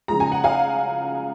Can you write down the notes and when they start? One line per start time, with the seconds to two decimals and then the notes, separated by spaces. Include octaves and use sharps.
0.08 C#3 F3 G#3 A#5
0.20 G#5
0.32 F#5
0.44 F5 G#5